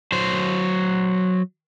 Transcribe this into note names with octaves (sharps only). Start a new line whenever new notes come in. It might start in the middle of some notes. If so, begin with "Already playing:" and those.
F#3 C5